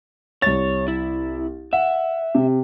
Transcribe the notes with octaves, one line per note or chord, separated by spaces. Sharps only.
C2 C#5 A6
E4
E5 F#5
C3